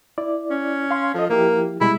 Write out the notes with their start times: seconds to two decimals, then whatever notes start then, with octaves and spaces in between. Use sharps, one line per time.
0.18 E4 D5
0.50 C#4
0.91 F5 C6
1.15 F3 A4 D#5
1.30 F3 A#3 E4 G4
1.81 B2 G3 G#3 E4